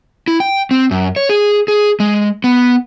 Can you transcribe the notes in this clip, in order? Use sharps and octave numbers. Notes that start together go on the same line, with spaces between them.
E4
G5
C4
F#2
C#5
G#4
G#4
G#3
B3